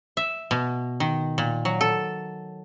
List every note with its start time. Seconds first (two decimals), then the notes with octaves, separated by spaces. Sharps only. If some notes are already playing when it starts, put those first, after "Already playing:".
0.17 E5
0.51 B2
1.00 D#3
1.38 A#2
1.65 F#3
1.81 A4